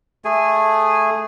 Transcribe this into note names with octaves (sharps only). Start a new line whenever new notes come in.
A3 G#4 G#5